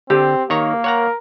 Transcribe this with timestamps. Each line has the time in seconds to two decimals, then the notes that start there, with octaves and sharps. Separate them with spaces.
0.10 D3 C4 G4
0.50 D#3 A#3 C#5 A#5
0.84 A#4 C#5 F#5 A#5